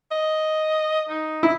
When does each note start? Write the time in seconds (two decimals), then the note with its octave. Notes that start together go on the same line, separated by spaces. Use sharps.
0.11 D#5
1.09 D#4
1.43 E4